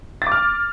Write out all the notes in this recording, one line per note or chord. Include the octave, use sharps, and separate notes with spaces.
D6 F6 A6